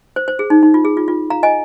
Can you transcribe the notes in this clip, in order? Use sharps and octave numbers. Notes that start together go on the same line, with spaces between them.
C5
C5
G#4
D#4
D#4
F4
G#4
F4
F4
F5 A#5
D#5 G#5